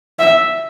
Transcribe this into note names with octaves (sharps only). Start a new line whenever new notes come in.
E5